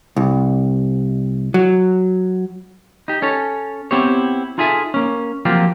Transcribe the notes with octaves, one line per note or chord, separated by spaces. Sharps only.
C2
F#3
D#4 G4
C#4 A4 C#5
B3 C4 E4 G4 C5 C#5
D#4 F4 G#4 A4 E5 G#5
A#3 C#4
F3 F#3 A#3 C4 F4 G4